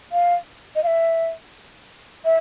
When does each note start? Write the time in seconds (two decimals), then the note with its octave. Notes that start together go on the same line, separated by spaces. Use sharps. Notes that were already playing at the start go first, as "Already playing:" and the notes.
0.12 F5
0.76 D#5
0.84 F5
0.87 E5
2.25 E5